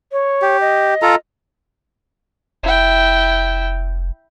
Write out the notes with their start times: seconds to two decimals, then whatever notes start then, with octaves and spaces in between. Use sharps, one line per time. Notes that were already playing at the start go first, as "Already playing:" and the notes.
0.12 C#5
0.42 G4
0.61 D#5
1.02 F4 A4 A#5
2.63 F1 E4 G5